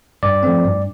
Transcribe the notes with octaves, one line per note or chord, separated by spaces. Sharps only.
G2 D5
F3 A3 C4
G2